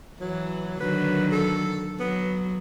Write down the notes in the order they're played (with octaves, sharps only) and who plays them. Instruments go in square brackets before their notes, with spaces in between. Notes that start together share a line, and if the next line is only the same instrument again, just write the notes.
[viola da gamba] E3 [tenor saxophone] F#3
[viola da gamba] D3 D#3 F#3 [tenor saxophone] B4
[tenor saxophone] A4
[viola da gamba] F#3 [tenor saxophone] B3